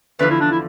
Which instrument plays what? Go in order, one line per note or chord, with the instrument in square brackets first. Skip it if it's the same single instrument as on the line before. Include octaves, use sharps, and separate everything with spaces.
[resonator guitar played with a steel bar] E2 D3 F3 [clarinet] B4
[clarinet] E4
D4
E4